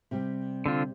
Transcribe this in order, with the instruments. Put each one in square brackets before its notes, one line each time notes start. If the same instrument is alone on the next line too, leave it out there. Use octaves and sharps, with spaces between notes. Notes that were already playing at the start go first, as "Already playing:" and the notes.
[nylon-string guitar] C3 G3
[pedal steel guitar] D3 C4 F4